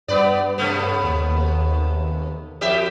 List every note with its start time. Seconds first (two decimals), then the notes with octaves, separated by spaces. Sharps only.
0.08 G2 B3 B4 D5
0.58 C3 A3 B3
1.03 D#2
2.61 F2 G4 E5